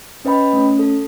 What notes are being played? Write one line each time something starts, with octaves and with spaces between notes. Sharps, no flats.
C#4 B4 D#5 G5 B5
A3 C#4
A4